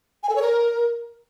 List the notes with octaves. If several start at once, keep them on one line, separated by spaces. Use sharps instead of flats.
G#5
A4
C#5
A#4